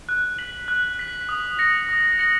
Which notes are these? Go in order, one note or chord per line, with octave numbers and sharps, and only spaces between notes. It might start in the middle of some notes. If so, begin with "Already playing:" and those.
F#6
B6 F#7
F#6
B6 F#7
D#6
A#6 C#7 F#7
D#6
A#6 C#7 F#7